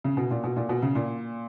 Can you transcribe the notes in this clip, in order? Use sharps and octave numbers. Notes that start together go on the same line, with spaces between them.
C#3
B2
A#2
B2
A#2
B2
C#3
A#2